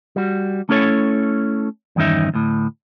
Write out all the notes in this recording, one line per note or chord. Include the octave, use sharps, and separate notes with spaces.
G3 F#4
A3 C#4 E4 A4 C#5
E2 G2 D#3 C#4 D#4 E5
D2 A2